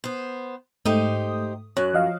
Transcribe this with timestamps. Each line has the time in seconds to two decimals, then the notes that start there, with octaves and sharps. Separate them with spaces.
0.04 B3 C5
0.85 G#2 A3 D#4 G4 C5 D#6
1.77 F#2 C#5 F#6
1.94 F3 D#5 F5